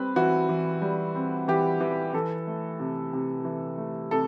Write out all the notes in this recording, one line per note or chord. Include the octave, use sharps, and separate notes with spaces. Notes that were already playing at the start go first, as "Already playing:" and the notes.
Already playing: G3 C4 B4
E3 F#4
E3
G3
C4
E3 G4
E3
E3 A4
A3
C3
C3
E3
A3
C3 A4